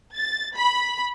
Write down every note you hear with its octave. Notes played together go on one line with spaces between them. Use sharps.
A6
B5